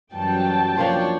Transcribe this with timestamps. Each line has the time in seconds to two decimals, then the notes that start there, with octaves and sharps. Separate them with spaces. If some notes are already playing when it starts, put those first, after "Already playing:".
0.14 F#2 E3 F#3 G3 G5 A5
0.77 F3 A#3 D4 C5 C#5